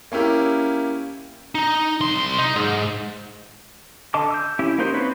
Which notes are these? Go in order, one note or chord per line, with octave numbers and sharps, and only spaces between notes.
A#3 C#4 E4 G4 A#4
D#4
C2 C6
D#4
G#2
D3 D#5 A5 D6
E6 G6
C#4 E4 G4
A#3 D#4 F#4 C5
C4 B4 C#5 B5